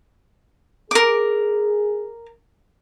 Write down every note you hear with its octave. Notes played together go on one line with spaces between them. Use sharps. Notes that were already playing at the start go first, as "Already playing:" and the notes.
G#4 A#4 D6